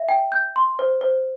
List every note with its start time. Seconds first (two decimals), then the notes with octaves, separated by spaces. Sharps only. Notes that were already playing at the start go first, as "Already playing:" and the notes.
Already playing: E5
0.09 G5
0.32 G6
0.56 C6
0.79 C5
1.01 C5